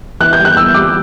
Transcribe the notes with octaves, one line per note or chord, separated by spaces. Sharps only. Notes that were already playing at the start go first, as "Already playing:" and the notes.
E3 F#6
G6
G3
F#6
E3 E6
G3 D6